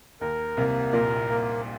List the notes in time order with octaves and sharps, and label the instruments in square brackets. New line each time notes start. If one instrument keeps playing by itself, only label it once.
[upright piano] D#2 D#3 [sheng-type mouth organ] A#4
[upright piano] C2 C3 [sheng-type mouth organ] A#3
[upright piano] A#1 A#2 [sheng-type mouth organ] A#4
[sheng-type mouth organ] A#3